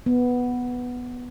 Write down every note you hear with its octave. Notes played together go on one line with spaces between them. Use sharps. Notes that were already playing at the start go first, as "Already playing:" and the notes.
B3